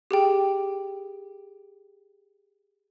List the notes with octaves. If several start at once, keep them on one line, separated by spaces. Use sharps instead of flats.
G4 G#4 G5